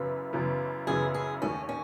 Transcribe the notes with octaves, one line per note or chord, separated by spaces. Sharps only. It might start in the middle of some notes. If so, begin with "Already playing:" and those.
Already playing: F#2 C#3 E3 B3 B4
F#2 C#3 E3 B3
F#2 C#3 E3 B3 G#4
G#4
D#2 D#3 A3 C#4
C#4